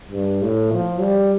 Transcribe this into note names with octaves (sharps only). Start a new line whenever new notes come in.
G2
A2
F3
G3